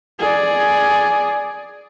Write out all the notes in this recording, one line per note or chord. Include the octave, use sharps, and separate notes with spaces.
G#4 D5